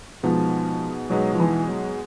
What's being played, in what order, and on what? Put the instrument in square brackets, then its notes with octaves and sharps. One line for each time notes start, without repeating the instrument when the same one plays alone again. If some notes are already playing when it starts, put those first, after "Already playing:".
[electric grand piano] B2 G#3 B3 D#4 [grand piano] F3
[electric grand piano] B2 G#3 B3 D#4 [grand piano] F#3
[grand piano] F3
E3
F#3